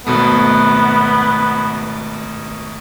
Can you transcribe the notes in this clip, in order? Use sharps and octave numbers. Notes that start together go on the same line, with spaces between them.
G#1 B2 A3 B3